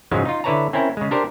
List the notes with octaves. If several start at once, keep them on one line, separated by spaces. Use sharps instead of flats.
G#2 C#3 F3 F#3 G#3
D#4 F4
D3 E4 B4 C#5 A5 A#5
C4 C#4 E4 A#4
C#3 G#3
D4 G4 A#4 C5